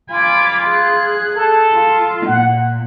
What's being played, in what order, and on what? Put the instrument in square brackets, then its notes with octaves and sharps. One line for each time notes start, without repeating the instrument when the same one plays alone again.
[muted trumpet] F4 [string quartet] G#5 B5 D6
[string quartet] G#4 F#6
[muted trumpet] A4
[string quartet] F4
[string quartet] A#2 [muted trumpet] F#5